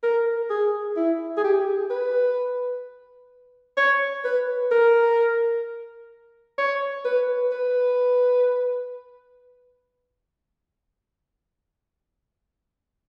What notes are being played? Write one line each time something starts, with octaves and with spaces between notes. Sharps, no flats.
A#4
G#4
E4
G#4
G4
B4
C#5
B4
A#4
C#5
B4
B4